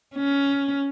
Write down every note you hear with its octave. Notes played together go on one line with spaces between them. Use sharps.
C#4